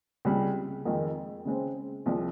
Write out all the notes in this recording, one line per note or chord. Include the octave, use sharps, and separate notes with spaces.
C#2 C3 G3
F2 D#3 G#3
C#3 G#3 C4
C2 C3 F3 G#3